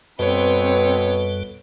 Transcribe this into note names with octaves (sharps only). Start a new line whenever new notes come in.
F#2 B2 G3 C4 A4 B4 C#5